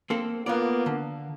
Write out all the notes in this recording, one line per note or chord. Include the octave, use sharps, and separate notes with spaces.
A#3 C4 A4
A#3 B3 F4 D5
D3